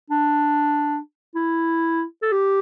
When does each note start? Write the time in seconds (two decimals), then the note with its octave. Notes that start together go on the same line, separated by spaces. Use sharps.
0.10 D4
1.35 E4
2.22 A4
2.32 G4